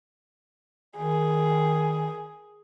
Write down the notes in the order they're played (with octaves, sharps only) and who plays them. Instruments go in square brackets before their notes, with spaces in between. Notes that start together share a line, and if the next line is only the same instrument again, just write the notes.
[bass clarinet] D#3 [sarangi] G#4